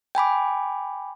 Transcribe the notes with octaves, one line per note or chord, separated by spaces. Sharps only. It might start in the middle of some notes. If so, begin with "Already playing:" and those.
G5 G#5 B5 D6